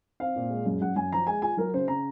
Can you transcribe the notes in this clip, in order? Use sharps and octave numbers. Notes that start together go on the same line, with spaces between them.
C4 F5
A#2
G#3
F#2
F#2 F#5
F#2 G#5
F3 A#5
G#3 G#5
F4 G#5
F#3 A#4
C#3 C5
C#3 A#5